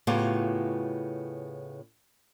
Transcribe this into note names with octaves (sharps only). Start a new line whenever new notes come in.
A2 C#3 B3 C#4 F4 G4